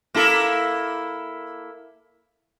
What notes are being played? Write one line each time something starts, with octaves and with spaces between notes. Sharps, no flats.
A#3 E4 A4